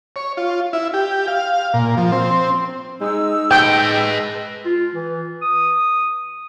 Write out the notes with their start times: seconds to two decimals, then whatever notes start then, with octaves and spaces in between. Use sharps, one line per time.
0.16 C#5
0.37 F4
0.73 E4
0.94 G4
1.28 F5
1.74 A#2
1.97 F3
2.12 C4
3.01 G#3 D#4 E6
3.51 B4 G5 A5
4.66 F4
4.95 E3
5.42 D#6